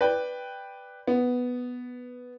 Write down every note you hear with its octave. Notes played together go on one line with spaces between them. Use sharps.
B4 D5 G5
B3